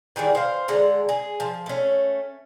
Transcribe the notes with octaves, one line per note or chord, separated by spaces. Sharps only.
D#3 E3 G3 G#4
C5 F5
D3 G#3 A#5
G#4
F3
A3 C#4